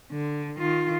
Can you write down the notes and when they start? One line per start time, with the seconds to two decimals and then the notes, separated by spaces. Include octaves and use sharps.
0.12 D3
0.58 D#3 F4